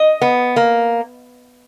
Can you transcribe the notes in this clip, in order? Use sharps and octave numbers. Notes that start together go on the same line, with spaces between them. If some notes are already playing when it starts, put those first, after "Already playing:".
Already playing: D#5
B3
A#3